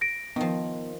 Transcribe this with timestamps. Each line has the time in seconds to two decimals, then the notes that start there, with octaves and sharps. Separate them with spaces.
0.01 A#6 D7
0.36 D#3 F3 B3